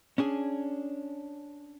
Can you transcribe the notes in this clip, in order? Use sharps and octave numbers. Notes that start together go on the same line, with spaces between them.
C#4 D4 G#4